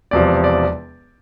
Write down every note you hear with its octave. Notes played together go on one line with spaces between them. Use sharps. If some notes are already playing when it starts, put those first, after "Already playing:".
E1 E2 C3 F3 D5
D5